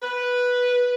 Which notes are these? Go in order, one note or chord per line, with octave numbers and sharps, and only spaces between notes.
B4